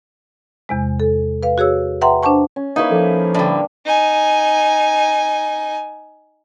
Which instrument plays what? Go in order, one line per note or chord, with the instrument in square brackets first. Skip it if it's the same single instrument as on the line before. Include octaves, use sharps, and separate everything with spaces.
[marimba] E2 C3 G#3
A4
B4 F5
F#4 G#4 C#5 E6
B4 E5 F#5 G5 A#5 C6
D4 C5 F#5 A5 C#6
[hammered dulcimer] C#4
[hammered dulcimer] A#3 B4 C#5 [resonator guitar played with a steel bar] D#4 E4
[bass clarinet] F3 [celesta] A4
[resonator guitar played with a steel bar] A2 D3 [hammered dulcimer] G3 D4
[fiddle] D#4 G#5